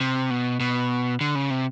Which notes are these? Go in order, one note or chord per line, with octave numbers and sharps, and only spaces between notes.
C3
B2
B2
D3
C#3
C3